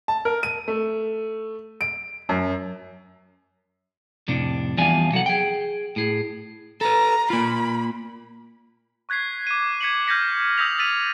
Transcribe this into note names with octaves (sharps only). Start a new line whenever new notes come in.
A5
A#4
D#7
A3
D7
F#2
F2 A2 C3 D4
E2 F3 G3 F4 D5 G#5
C3 F#3 A4 F#5
G#4 G5
A2 G#4
A4 B4 A#5
A#3 F4 B5
C#6 F#6 G#6 B6 C7
D6 D#7
G#6 B6 C#7 D#7 F#7
F6 G6 G#6 A#6 B6 C#7
D#6 E6 G6 A#6 B6 F7
E6 A6 B6 D#7 F7